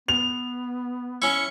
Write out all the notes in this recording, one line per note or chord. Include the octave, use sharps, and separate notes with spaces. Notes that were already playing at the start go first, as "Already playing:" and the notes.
B3 F7
C#4 E4 C#7